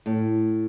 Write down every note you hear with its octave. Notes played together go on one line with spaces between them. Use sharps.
A2